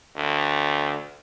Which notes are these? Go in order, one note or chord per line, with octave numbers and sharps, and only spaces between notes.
D2